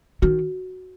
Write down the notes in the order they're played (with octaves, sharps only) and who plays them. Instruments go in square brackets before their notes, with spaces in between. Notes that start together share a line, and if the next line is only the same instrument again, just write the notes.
[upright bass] D#3 [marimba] F#4